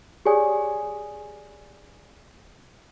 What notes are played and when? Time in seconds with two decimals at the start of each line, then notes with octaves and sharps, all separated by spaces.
0.25 G4 G#4 C#5 D5 G#5 D#6